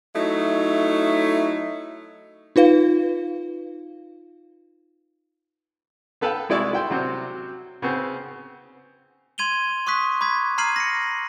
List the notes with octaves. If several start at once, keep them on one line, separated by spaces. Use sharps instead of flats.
F#3 A3 D#4 E4
D#4 F4 B4 F5
B3 A4 B4 F5 G5 A5
C2 G#3 E4 D5 C#6
E4 G5 C6
C3 F#3 C4
C#3 B3 C4
C6 G#6 D#7 F7 G7
C6 C#6 D#6 F#6 B6
B5 D6 G#6 B6
A#5 F6 G#6 C7 D#7 F#7
A#6 C#7